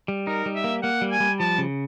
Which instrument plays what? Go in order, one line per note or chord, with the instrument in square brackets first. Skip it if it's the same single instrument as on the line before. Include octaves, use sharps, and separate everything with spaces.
[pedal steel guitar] G3
[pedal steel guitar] D#4 [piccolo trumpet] A#4
[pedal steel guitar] G3
[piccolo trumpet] E5
[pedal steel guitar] A#3
[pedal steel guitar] A#3 [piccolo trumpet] F#5
[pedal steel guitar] G3
[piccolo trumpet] G#5
[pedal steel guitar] G3
[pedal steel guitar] F3 [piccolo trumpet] A5
[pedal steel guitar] C#3